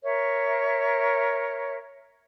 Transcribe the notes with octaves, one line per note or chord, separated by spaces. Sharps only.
A#4 C#5 E5